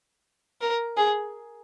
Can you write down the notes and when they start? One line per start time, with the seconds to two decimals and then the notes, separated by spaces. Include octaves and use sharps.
0.61 A#4
0.97 G#4